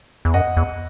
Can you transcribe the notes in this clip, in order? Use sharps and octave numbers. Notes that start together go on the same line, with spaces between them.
E2
F#2 D#5 F#5
E2